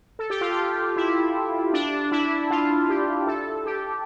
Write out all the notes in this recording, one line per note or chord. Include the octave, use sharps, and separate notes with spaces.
A4
G4
F4
G4
E4
D4
E4
F4
G4
A4
G4